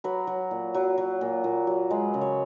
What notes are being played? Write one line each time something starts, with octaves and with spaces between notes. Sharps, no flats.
F#3 B4
F#3
A#2
F#3
F#3
A#2
A#2
F#3
G#3 B4
C#3
C#5